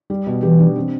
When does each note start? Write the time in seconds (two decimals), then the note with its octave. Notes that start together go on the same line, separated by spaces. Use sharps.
0.10 G3
0.27 B2
0.43 E3 G4
0.59 D4
0.76 C4